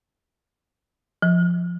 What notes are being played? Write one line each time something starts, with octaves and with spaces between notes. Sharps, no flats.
F3